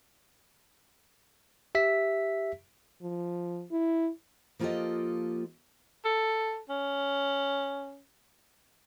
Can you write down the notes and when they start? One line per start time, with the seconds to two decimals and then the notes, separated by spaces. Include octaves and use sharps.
1.75 G4 E5 B6
3.02 F3
3.71 E4
4.59 F3 A#3 F4 G4 A4 D#5
6.05 A4
6.69 C#4